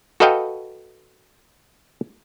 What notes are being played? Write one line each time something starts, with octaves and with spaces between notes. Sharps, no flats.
F#4 A4 B4 D#5 F5 G5